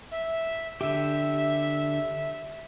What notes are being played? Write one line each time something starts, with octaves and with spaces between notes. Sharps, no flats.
E5
D3 G4 E5